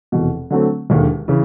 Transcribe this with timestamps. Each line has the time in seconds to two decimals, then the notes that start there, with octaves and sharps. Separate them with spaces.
0.12 F1 E2 B2
0.51 D3 F#3 A3 C4
0.90 E1 D#2 D3
1.28 C#3 E3